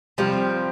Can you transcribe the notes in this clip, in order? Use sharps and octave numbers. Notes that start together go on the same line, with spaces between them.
C3 F3 G3 C4 G4